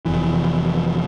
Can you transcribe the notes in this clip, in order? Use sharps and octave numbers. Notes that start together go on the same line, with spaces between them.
F1 E3